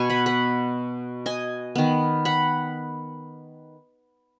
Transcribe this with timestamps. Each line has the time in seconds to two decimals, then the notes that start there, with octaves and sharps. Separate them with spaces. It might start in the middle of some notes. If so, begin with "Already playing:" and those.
Already playing: B2 B3 G#5 C#6
0.09 F#5 B5
0.26 F#5 B5
1.26 D#5 G#5
1.76 D#3 B3
2.25 F#5 B5